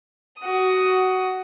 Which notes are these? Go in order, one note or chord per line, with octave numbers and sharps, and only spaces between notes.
F#4 D#6